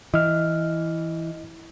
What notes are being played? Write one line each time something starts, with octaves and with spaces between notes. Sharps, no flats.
E3 D#5 F6